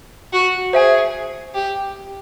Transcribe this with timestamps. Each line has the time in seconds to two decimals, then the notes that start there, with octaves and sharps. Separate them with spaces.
0.33 F#4
0.73 G#4 C5 E5 G#5
1.54 G4